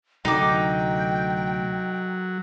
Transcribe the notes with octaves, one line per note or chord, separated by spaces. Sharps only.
D2 C3 F#3 A3 D#4 G5 D6